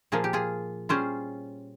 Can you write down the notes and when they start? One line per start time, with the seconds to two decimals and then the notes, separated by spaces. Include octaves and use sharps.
0.12 A#2 F3 A#3 G#4
0.24 G4
0.33 F4 G#4
0.89 G3 C#4 F4 G#4 C5